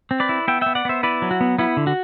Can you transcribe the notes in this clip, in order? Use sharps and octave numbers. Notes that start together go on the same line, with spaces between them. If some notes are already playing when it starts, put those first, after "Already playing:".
C4
B4 D5
E4
B3 E5 G5
B3 E5 G5
D5 F#5
B3 C5 E5
E4 B4 D5
F#3
F#4
B3
B3 E4
D3
F#4